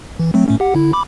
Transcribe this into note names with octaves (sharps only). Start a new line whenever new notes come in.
E3
F#3 A3 C4
A2 A3 C#4
G4 F#5
D3 E4
B5 D6